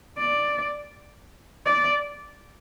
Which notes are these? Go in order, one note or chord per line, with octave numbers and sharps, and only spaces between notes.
D5
D5